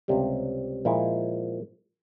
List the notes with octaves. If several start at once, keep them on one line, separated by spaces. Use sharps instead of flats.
C#2 C3 G3
A#2 F3 G#3 E4